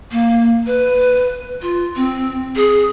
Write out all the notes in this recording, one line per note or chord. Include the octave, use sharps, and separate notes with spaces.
A#3
B4
F4
C4
G#4